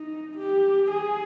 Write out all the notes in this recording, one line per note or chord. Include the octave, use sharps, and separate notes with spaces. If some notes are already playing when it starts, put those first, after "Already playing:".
Already playing: D#4
G4
G#4